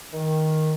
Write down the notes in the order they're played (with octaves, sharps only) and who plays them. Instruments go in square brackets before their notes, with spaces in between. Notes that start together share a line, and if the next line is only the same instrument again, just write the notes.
[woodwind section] D#3